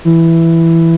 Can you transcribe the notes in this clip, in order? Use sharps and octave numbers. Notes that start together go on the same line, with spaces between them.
E3